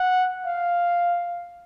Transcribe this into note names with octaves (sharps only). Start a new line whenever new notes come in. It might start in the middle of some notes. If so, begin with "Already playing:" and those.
Already playing: F#5
F5